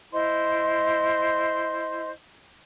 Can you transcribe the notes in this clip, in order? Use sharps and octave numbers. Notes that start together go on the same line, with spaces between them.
E4 C5 D#5 C6